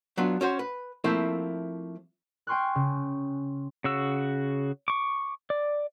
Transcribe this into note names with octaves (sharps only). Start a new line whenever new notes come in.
F#3 B3 D4 F4
C#4 F#4 C5
B4
F3 A3 A#3 C4 E4
G5 G#5 C6 C#6 F6 F#6
C#3
C#3 F#4 E6
C#6 D6
D5